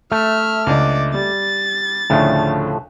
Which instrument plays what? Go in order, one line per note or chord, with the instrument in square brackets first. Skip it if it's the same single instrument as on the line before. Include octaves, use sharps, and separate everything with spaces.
[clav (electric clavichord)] A3 [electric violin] E5 F6
[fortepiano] C#2 D4 D#5 [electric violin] D5
[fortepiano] G3 [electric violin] A6
[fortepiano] D2 C#3 D4 [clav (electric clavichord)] A2 F3 A3